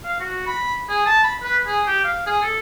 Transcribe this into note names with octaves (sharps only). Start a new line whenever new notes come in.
F5
F#4
B5
G#4
A5
B5
B4
G#4
G4
F5
G#4
A4